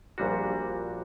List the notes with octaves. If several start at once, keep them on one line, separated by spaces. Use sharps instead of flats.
A#1 A#2 G3 D4 F#4